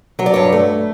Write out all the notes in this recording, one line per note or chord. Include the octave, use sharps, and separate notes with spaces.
F#3 C#5
D5
G2 C#5
A3